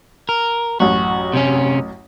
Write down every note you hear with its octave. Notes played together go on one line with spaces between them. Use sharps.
A#4
A1 F#2 F#4
C3 C#4